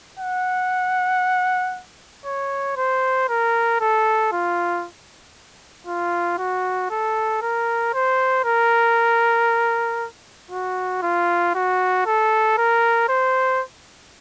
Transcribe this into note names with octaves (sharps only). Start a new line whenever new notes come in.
F#5
C#5
C5
A#4
A4
F4
F4
F#4
A4
A#4
C5
A#4
F#4
F4
F#4
A4
A#4
C5